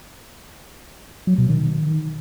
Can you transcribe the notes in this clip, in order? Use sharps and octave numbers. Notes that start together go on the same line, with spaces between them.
F#3
B2
D#3